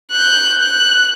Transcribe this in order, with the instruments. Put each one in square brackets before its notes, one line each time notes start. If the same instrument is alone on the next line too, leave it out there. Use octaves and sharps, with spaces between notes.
[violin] F#6 G6
F#6